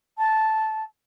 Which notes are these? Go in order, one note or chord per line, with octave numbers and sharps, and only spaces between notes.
A5